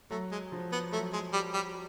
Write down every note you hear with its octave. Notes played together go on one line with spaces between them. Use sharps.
F#3 A3
G#3
F3
B3
F#3 A3
G#3
G3
G3